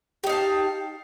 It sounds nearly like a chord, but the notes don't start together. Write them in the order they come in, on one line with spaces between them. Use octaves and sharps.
G4 D#4 F5 A5